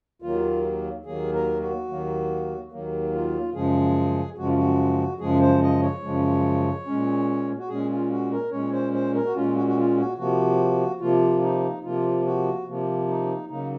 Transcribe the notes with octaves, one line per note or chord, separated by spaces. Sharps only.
D#2 D#3 F#3 A#3 F4
D#2 D#3 F#3 A#3 G#4
A#4
F#4
D#2 D#3 F#3 A#3
D#2 D#3 F#3 A#3
F4
F#2 C#3 F3 G#3 G#4
F#2 C#3 F3 G#3 F#4
F4
F#4
F#2 C#3 F3 G#3 G#4
C5
D#5
C#5
F#2 C#3 F3 G#3
A#2 G#3 C#4
F#4
A#2 G#3 C#4 G#4
F4
F#4
A#4
A#2 G#3 C#4 C#5
C5
C5
A#4
F#4
A#2 G#3 C#4 F4
F#4
F#4
F4
F#4
C3 F3 A#3 F#4
C3 F3 A#3 F4
D#4
C3 F3 A#3 F4
F#4
C3 F3 A#3
D#4
C#3 F#3 A#3 D#4